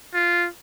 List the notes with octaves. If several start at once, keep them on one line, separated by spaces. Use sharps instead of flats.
F4